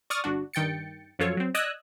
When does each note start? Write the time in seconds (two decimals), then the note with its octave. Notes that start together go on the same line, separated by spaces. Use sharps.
0.10 D5 C#6 D#6 F6 A6
0.24 G1 D4 F#4
0.54 G2 D#3 G5 A6 C#7
1.19 F#2 F3 F#3 F4 A4 C#5
1.37 F#3 C4
1.54 D5 D#5 D#6 E6 F#6 G#6